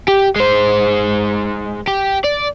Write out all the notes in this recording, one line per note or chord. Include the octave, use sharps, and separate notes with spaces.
G4
G#3 C5
G4
D5